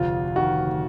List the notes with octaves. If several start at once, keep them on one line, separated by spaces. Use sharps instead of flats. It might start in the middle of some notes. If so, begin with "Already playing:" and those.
Already playing: F1 D2 F4
D#3 F#4